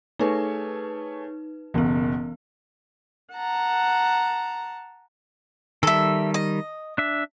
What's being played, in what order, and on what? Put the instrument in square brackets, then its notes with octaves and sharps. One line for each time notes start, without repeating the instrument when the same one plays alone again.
[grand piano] A3 G#4 C#5 [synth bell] D#4 B4
[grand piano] F#1 B2 [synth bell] E3 B3
[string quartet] F#5 A5 A#5
[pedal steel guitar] D#3 G3 [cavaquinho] A4 E5
[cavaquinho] D#5
[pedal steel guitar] D4 E5